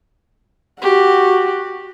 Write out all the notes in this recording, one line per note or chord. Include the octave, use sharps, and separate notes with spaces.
F#4 G4